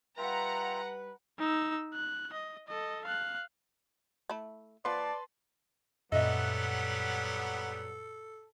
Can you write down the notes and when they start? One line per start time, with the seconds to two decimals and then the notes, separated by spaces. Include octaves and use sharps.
0.18 G3 F4 B4 E5 F#5 G5 A#5
1.39 D#4 E6
1.94 F#6
2.33 D#5
2.68 A4 D#5
3.05 F5 F#6
4.30 A3 E4
4.85 F3 B3 B4 D5 A5 C6
6.12 F#2 A#2 F#3 G3 B3 A4 D#5 E5